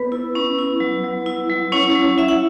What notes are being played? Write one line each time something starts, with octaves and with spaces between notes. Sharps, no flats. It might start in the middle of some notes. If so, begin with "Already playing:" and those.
Already playing: B3 B4
E4
C#4
E4
F#3
F#3
E4
F#3
C#4 E4 C#5
F#3
E4 E5
F#5